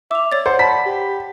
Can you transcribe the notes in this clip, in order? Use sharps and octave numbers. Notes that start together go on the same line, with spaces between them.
E5 D6 F7
C#5 D5 A6
C5 F#5
A5 B5 B6
G4